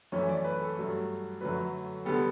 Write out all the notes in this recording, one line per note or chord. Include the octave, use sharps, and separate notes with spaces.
F#2 E3 A3 C#4 C#5
D5
B4
A4
G2 F#3 A3
F#2 D3 F#3 A3 B4
D3 G3 B3 A4